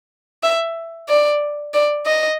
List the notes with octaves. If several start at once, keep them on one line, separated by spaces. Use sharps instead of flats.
E5
D5
D5
D#5